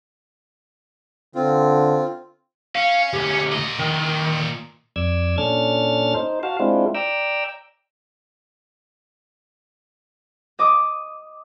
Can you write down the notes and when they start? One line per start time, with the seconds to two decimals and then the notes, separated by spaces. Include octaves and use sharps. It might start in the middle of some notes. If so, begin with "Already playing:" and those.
1.35 D3 C4 F4
2.76 C#4 F5
3.13 D2 G4
3.52 A#2 D#5
3.79 D#3
4.96 F2 D5 E6 G#6
5.38 A#2 C#4 D4 A4 F6 A6
6.15 D#4 C5
6.43 F#4 F5 A5
6.60 G#3 C4 D4 E4 F4
6.95 D5 G5 A#5 E6
10.59 D#5 D6 D#6